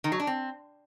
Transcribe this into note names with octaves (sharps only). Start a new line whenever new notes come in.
D#3
F#3
D4
C4